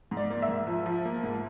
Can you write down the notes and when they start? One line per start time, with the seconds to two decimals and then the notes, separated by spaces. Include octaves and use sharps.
0.11 G#2
0.17 D5
0.30 A#3
0.42 E5
0.48 G#2
0.67 F3
0.86 F3
1.05 A#3
1.23 G#2